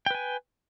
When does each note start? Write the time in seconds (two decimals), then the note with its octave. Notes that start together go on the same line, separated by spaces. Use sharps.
0.06 G5
0.11 B4
0.15 G#5